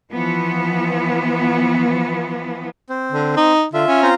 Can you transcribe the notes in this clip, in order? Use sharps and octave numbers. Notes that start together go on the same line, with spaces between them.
E3 F3 B3
C4
D3
D#4
D3 F4 E5
C#4
C4 F4 A#5